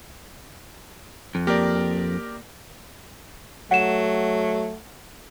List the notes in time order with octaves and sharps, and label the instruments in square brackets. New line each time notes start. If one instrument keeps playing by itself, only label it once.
[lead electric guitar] F2
[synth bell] A#3 [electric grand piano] G4 A#4 D5
[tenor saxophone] F#3 [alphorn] A3 [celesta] F#5 E7